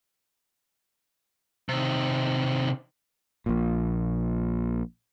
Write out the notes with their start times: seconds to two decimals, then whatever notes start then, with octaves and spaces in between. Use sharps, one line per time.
1.69 C3 D#3
3.46 A#1 A#2